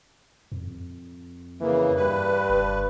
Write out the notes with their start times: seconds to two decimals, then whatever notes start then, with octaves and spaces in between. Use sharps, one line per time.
0.52 F2
1.61 C#3 E3 A#3
1.96 G2 B4
2.50 F#1